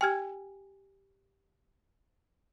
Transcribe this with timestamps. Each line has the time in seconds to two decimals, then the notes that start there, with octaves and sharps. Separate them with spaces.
0.01 G4 G5 G#5 F6 G#6